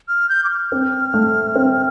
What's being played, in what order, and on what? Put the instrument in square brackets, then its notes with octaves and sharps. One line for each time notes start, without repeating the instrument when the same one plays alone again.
[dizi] F6
G6
D6
F6
[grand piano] C4
A3
C4